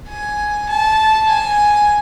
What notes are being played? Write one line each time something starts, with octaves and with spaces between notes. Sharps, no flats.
G#5
A5
G#5